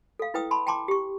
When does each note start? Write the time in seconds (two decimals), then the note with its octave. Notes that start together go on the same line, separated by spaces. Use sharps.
0.19 A4 F5
0.34 E4 B4 G5 D#6 E6
0.51 A5 B5 C6
0.67 G5 A5 A#5 C6 D6
0.88 G4 C#6